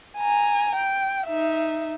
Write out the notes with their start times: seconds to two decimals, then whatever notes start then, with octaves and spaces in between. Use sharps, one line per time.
0.18 G#5 A#5
0.75 G5
1.27 D#4 E5